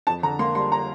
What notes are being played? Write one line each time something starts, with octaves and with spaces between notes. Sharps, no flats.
F2 A5
D3 A#5
A#3 C6
G3 C6
A#5